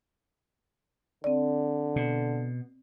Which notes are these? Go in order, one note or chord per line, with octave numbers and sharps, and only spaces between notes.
D3 C4 D5
B2